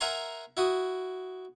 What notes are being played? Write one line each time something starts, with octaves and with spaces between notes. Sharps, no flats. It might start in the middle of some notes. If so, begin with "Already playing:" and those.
A#4 E5 F#5 G#5 A#5 C6
E4 F#4 D#6